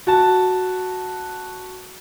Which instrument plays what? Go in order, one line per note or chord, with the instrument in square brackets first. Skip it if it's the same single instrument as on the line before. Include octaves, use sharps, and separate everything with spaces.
[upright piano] F#4 A5